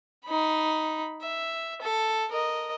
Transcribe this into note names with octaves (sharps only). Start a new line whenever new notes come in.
D#4 B5
E5
A4
A#4 D#5